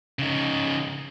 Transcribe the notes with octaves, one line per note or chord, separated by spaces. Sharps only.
C#3 D#4